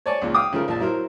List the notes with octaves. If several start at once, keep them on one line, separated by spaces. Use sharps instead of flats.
C#5 D5 G#5 A5 C#6
C#2 A#2 F3
F5 G5 D#6
C#3 F3 A3 A#4
A#1 F3 A5
F#3 E4 A#4 C5